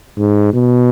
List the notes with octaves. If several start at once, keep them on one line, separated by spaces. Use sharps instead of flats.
G#2
B2